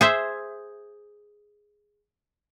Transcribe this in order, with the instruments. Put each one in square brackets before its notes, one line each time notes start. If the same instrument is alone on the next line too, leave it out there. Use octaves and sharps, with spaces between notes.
[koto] G#4 C5 E5